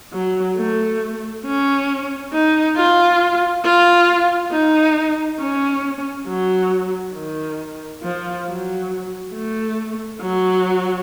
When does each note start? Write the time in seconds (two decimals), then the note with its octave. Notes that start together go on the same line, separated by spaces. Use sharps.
0.13 F#3
0.57 A3
1.45 C#4
2.33 D#4
2.76 F4
3.64 F4
4.51 D#4
5.40 C#4
6.27 F#3
7.15 D#3
8.03 F3
8.47 F#3
9.34 A3
10.22 F#3